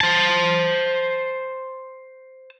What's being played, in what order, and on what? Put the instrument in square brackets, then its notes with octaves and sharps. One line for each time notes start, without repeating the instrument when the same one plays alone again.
[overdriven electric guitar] C5 A5